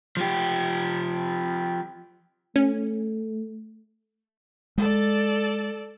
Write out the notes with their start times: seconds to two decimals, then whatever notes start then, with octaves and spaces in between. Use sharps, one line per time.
0.17 F3 G4
2.56 A3 C#4
4.78 G#3 A4 D5